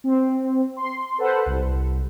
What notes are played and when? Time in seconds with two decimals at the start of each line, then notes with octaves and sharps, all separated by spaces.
0.04 C4
0.77 C6
1.18 A4 B4 C5 F#5
1.46 C2